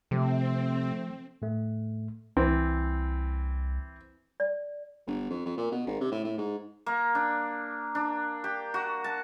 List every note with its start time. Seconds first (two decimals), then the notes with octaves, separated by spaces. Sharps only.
0.11 C3 F3 A3 C4
1.42 A2 A3
2.37 C2 E3 C4
4.40 D5
5.07 G1
5.30 F2
5.46 F2
5.58 A#2
5.72 B2
5.87 G#1
6.01 C3
6.12 A2
6.24 A2
6.38 G#2
6.86 A#3
7.15 D4
7.95 D4
8.44 G4
8.74 F#4
9.04 A5